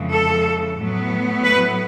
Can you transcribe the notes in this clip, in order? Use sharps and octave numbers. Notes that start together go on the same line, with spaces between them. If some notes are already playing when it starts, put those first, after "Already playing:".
Already playing: F2 C#3 E3 G#3
A4
A2 F#3 B3
B4